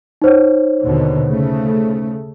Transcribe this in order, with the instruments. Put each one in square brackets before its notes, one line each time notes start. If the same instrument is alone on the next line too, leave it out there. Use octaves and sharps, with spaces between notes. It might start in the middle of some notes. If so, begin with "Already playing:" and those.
[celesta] D#4 C5 C#5
[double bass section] D#2 B2 D3
C#3 A3